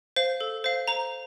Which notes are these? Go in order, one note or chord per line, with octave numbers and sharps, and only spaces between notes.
C5 F5
A4
C5 F5
C5 A#5